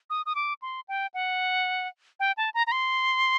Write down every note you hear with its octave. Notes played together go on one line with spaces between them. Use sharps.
D#6
D#6
D6
C6
G5
F#5
G5
A5
A#5
A#5
C6